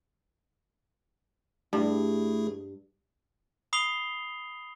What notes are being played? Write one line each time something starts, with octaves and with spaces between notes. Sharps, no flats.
G2 A3 E4 G#4
B5 D#6 C7 F7 G7